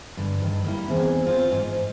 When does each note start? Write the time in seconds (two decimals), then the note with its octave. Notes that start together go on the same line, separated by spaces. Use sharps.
0.17 G2 D3
0.42 G2 D#3
0.64 G3 A#3 E4
0.88 E2 D#3 C4 G#4
1.24 C4 F4 C5
1.52 G#2